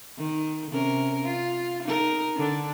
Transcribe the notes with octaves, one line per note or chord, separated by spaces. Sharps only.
D#3
C3 C#4 A#4
F4
D#4 A#4
D3 D4